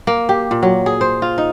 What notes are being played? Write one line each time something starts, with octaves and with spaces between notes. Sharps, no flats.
A#3
G4
A#2
F#3
G#4
C5
F4
D#4